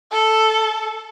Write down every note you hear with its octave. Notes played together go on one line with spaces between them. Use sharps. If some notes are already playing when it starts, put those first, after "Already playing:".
A4